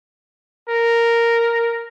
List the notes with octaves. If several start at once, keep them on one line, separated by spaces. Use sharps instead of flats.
A#4